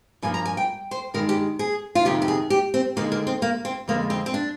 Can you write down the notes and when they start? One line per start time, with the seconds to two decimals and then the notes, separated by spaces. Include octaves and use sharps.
0.22 G2 F3 A#3 G#5
0.34 A#5
0.45 G#5
0.57 G5
0.91 C5
1.14 G2 D#3 G#3 A#4
1.29 G4
1.59 G#4
1.95 F4
2.05 F2 C3 D#3 G4
2.22 G4
2.28 G#4
2.50 G4
2.74 C4
2.97 D#2 D3 G#3 A#3
3.12 A#3
3.27 C4
3.42 A#3
3.65 C4
3.88 F2 D3 G#3 A#3
4.10 C4
4.26 C4
4.34 D4